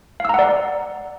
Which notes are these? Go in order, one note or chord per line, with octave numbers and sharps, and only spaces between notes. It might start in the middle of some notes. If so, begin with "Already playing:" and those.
D5 F5 F#5 A#5 E6